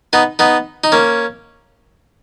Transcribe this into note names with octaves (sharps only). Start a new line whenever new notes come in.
B3 D#4
B3 D#4
D#4
A#3 C#4